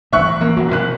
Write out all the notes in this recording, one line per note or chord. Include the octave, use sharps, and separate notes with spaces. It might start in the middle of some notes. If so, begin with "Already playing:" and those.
D#1 A1 G2 E5 C#6 F#6
A1
A1 E3 F3 A#3
A1 F#3
F#1 B2 F3 F#6